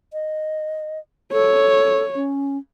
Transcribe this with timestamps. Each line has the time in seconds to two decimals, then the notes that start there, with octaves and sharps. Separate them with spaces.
0.13 D#5
1.32 A4 C#5
2.15 C#4